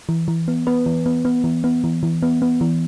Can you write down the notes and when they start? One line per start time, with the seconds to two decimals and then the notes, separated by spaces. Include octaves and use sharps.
0.09 E3
0.28 E3
0.48 B3
0.67 B3 B4
0.86 E3
1.06 B3
1.25 B3
1.44 E3
1.64 B3
1.84 E3
2.03 E3
2.23 B3
2.42 B3
2.61 E3